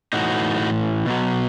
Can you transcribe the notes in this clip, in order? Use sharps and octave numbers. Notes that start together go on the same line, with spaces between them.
A2 E3 D#4 F#4
B2 F#3